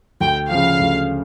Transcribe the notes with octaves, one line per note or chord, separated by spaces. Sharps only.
D2 G5
C#3 F3 F5
D2